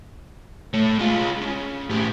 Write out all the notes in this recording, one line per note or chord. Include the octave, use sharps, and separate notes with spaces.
A3 C#5
G#3 F4
C#3
A2 G4